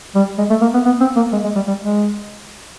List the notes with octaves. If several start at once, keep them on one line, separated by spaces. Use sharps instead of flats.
G3
G#3
A3
A#3
B3
B3
C4
A#3
G#3
G#3
G3
G3
G#3